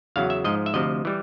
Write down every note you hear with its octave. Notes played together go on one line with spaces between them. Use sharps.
E2 C#3 F#3 F5
E5
G#2 F3 D#5
E5
D2 C3 F3 D#5
E3 G3